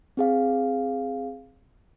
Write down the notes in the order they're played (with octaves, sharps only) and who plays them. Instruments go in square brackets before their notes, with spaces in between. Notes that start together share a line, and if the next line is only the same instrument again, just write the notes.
[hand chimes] C4 G#4 F5